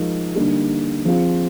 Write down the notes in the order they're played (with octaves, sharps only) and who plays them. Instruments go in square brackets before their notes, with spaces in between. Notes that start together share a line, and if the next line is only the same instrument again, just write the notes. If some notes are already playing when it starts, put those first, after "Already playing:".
Already playing: [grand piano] F3 G#3 D#4 A#4
D3 G3 A#3 D#4 G4
F3 C4 F4 G#4